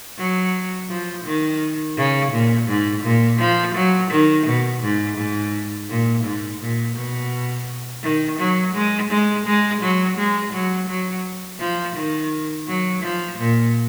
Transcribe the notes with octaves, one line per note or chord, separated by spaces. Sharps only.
F#3
F3
D#3
C#3
A#2
G#2
A#2
F3
F#3
D#3
B2
G#2
G#2
A#2
G#2
A#2
B2
D#3
F#3
G#3
G#3
G#3
F#3
G#3
F#3
F#3
F3
D#3
F#3
F3
A#2